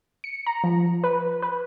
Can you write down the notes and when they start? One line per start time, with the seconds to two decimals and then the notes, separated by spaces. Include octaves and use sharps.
0.24 C#7
0.46 A#5
0.64 F3
1.04 B4
1.42 B4